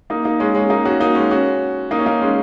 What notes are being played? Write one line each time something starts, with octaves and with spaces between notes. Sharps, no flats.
A#3 D#4
A#3 D#4
G#3 C#4
G#3 C#4
A#3 D#4
C#4 F#4
A#3 D#4
G#3 C#4
C#4 F#4
A#3 D#4
C#4
A#3 D#4
G#3 C#4